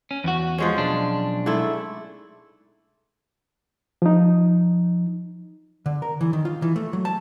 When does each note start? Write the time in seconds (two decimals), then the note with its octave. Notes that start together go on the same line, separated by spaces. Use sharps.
0.11 C#4
0.24 E2 F#4
0.58 F3 G#3 C#4
0.78 B1 D4
1.46 G#2 A3 E4
4.02 F3 D#4
5.86 D3
6.02 A#4
6.21 E3
6.33 D#3
6.45 F4
6.62 E3
6.76 A3
6.93 F#3
7.05 A5